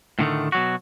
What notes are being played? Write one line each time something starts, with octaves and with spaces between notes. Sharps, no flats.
A2 D3 D#3 A3
B2 F#3 F#4